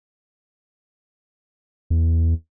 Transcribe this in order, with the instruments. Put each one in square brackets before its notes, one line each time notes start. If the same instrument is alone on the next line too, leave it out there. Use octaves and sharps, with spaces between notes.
[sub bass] E2